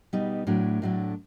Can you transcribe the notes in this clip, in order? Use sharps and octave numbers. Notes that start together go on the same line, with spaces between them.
B2 G3 B3 D#4
A2 F#3 A3 D4
A2 F#3 A3 D4